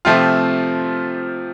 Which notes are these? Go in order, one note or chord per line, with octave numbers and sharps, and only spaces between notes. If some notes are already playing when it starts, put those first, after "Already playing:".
C3 F3 A3 C4 F4